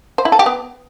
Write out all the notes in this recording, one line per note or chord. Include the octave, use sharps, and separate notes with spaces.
C5
E4
A4
G4
B3